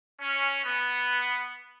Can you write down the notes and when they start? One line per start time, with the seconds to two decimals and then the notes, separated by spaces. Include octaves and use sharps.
0.21 C#4
0.65 B3